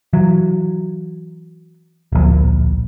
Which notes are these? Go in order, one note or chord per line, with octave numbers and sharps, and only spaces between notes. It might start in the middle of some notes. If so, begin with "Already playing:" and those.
E3 F#3
D1 A#1